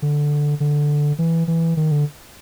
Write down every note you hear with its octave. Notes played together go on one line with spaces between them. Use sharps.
D3
D3
E3
E3
D#3
D3